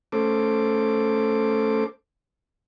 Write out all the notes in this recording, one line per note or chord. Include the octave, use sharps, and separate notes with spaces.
A3 C#4 A4 C5 D6